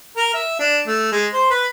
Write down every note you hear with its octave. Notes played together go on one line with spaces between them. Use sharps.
A#4
E5
D4
A3
G#3
C5
B4